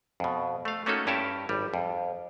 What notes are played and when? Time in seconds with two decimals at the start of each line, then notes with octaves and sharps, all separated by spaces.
0.20 F2 B2
0.65 A3 F5
0.86 A3 A#3 C#4 D#4 F#4 A4
1.07 G2 C#4 E4 G4 A#4 A5
1.49 G#1 G3
1.74 F2